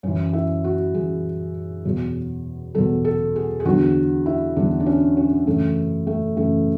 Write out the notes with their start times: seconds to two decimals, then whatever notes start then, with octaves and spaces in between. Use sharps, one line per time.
0.03 F#2 C#4
0.07 E3
0.33 E4
0.64 F#4
0.94 F#2 E3 G#4
1.85 E2 B2 F#3
2.75 E2 B2 F#3 A4
3.05 A4
3.36 G#4
3.60 G#4
3.65 E2 D3 F#3 F#4
4.26 E4
4.56 E2 D3 F#3 D4
4.80 D4
4.86 C#4
5.17 C#4
5.46 F#2 C#3 E3 A3
6.07 A3
6.37 F#2 C#3 E3 A3